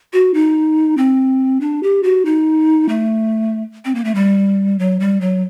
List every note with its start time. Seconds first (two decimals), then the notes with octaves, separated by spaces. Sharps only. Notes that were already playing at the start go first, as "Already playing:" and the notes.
0.13 F#4
0.34 D#4
0.97 C4
1.61 D4
1.83 G4
2.03 F#4
2.25 D#4
2.89 A3
3.85 C4
3.95 A#3
4.04 A3
4.15 G3
4.79 F#3
5.00 G3
5.21 F#3